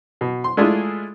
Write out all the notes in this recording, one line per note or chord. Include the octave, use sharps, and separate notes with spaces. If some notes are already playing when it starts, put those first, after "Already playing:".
B2
C6
G#3 A3 D4 E4 F4 G#4